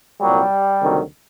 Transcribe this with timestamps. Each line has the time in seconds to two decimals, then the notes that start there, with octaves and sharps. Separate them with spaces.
0.22 C2 A#2 F#3 G3
0.81 D2 C3 D#3 F#3